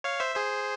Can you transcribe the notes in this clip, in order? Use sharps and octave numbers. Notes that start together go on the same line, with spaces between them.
C#5 F5
C5 E5
G#4 C5